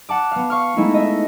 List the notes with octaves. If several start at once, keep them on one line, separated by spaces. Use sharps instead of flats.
F#5 A5 D6
B3 F5
F5 C#6 F6
G#3 A3 B3 D#4 E4
D#5 E5